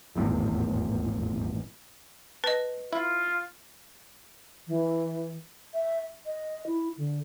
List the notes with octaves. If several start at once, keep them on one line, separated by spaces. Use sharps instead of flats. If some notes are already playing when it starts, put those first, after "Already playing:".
D#1 G#1 E2 A2
B4 D#5 A5
E4 F4
E3
E5
D#5
E4
D3